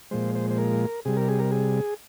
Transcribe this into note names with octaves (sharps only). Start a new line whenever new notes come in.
A#2 F3 G#3 C5
C5
C5
A#4
C3 G3 G#4
A#4
G#4
A#4
G#4